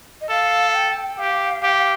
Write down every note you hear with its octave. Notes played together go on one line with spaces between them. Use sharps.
D#5
A4 F5
G5
G4 F5
G4